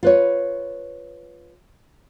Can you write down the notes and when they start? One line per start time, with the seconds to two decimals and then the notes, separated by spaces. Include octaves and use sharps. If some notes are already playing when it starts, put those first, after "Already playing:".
0.03 F4 B4 C#5